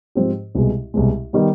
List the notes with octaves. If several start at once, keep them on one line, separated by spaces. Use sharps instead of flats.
G#2 F3 C4 G4
C2 B2 G#3
C2 B2 G#3
D#3 G3 B3